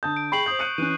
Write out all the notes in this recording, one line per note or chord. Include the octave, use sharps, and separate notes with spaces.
D3 A5 D#6 G6
D7
G#4 G5 B5 C#6 C7 F#7
C5 D#6 G6 C7
F#6 C#7 D#7
E3 C#4 F#6 D#7